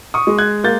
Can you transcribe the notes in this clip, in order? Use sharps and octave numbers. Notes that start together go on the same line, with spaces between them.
C#6 D#6
G#3
F#6 G#6
A#3 G6 A6